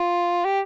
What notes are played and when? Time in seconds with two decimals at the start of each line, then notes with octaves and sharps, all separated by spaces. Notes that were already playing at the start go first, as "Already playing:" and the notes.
Already playing: F4
0.45 G4